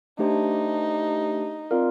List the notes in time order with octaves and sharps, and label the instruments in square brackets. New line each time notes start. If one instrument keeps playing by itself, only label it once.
[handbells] A3 D4 G4 C5 [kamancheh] D#4
[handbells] C4 F4 A#4 D5 F5